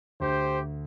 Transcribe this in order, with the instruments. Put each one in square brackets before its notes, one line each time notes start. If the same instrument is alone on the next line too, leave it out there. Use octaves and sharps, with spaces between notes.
[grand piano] D2 [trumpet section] G4 C5